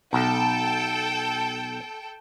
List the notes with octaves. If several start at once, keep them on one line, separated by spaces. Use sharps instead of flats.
B1 A4 G5